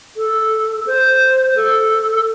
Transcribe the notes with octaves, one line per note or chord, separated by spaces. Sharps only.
A4
C5
A4